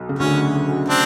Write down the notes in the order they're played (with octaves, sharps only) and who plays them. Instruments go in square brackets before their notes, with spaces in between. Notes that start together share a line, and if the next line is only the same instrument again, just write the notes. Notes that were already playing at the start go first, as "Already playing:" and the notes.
Already playing: [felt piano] B1
C#3
[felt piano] D2 D3 [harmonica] C#4
[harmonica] C4 D4